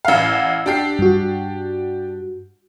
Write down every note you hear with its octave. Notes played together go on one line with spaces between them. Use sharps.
A1 F5 F#5 E6
D4 G4 C7
G2 F#4